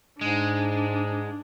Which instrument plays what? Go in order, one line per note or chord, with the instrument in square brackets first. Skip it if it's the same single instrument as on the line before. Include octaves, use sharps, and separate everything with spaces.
[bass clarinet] G#2 [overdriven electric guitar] G#3 [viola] D4